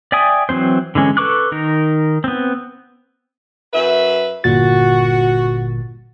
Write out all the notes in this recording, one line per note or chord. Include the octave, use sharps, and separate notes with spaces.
D5 E5 G5 G#5 D#6
E3 F#3 C4 C5
D3 E3 G#3 C#4
A4 B4 C#6 D6 F#6
D#3 D#4 A#4
B3 C4
F#2 B4 E5
G1 A#2 F#4 A6